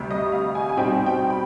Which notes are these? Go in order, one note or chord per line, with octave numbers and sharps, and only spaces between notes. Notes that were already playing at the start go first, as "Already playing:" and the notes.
Already playing: D2 C3 G3
D#5
F5
G#5
G#5
B2 G3 C4 D#4 G5
G5
B5